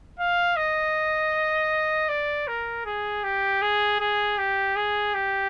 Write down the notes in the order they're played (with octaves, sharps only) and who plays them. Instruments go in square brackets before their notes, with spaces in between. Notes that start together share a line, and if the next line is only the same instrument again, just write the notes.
[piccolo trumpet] F5
D#5
D5
A#4
G#4
G4
G#4
G#4
G4
G#4
G4